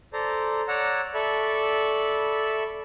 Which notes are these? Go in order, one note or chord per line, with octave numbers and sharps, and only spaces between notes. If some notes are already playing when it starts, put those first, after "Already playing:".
A4 C5 D5 A#5
C#5 D5 F#5 A#5 E6
A4 D5 E5 B5 C#6